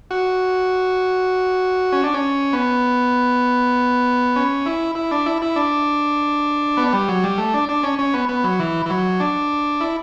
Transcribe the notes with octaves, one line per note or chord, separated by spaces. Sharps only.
F#4
C#4
D4
C#4
B3
C#4
E4
E4
D4
E4
E4
D4
B3
G3
F#3
G3
A3
D4
D4
C#4
C#4
B3
B3
F#3
E3
E3
F#3
D4
E4